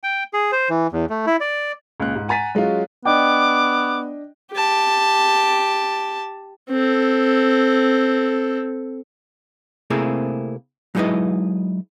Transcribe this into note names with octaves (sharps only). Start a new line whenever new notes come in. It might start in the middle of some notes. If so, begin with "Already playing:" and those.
G5
G#4
C5
E3
E2
A3
E4
D5
C#2 A#2 F#6
G#2
F#5 G#5 A#5 A6 B6 D#7
F#3 G#3 C#4 F4
B3 D4 D#5 G5 D6
G4 A5
C4 A4
C3 A3 A#3 C4 E4 G#4
F#3 G#3 D#4 E4 B4 D#5